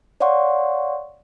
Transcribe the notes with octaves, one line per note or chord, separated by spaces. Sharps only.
C#5 D5 F5 F#5 C6 C#6